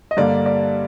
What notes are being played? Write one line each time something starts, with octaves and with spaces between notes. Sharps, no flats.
D#5
G2 D3 G3 A#3 D5
D5